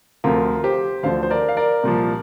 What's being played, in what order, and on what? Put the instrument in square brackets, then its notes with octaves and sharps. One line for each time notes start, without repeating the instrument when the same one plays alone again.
[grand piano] D2 C3 F3 F4 A#4
G4 C5
D2 D3 F3 C5 F5
C5
A#4 D5
F5
A#4 D5
C2 A#2 F3